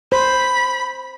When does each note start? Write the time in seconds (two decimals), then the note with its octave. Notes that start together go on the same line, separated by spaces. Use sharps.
0.12 C5 B5